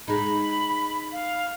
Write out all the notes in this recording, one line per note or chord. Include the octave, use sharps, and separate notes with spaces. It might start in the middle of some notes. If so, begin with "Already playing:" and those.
G#3 D#4 B5
F5